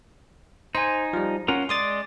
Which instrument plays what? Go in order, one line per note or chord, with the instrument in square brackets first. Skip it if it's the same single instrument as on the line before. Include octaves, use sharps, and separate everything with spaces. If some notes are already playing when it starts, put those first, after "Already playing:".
[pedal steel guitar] D#4 G#5 [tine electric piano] C5
[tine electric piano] F3 G3
[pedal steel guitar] C#4 F4 A#4 [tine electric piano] F#5
[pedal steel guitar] G#3 D5 [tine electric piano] C6 D#6 A6